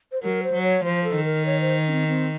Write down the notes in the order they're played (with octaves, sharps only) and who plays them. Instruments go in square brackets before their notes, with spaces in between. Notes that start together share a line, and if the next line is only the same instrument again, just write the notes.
[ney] C5
[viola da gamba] F#3 [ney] A#4
[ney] C5
[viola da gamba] F#3
[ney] C#5
[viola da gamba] F3 [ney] C5
[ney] A4
[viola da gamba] D#3
[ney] A#4
C#5
C5
C#4
C4
C4